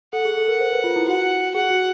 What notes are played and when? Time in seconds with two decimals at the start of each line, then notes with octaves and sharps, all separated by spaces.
0.13 A4 F#5
0.25 G#4
0.37 A4
0.48 A#4
0.60 C5
0.73 B4
0.84 F4
0.96 E4
1.07 F#4 F#5
1.55 G#4 F#5
1.70 F#4